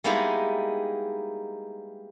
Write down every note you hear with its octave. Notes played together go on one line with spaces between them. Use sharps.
G3 G#3 A#3 B3 D#4 E4